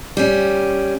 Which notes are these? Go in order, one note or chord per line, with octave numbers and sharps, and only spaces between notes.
G3 C#4